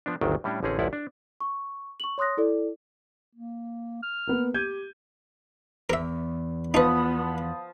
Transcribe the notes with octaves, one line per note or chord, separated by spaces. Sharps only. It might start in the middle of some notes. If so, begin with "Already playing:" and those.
F3 B3 D4
G1 D2 D#3 F#3 D4 G5
A2 G3 C#4 D4
A1 D3 C4 C#4 G#4
A1 D2 F3 E4 D5 F#5
D4
C#6
C#6 F#7
C#5 C6 D#6 F#6 A#6
E4 A4 D5
A#3
F6
A#3 B3
G4 G6 G#6 D#7
E2 A#4 E5
F3 B3 D#4 B4 B5 D#6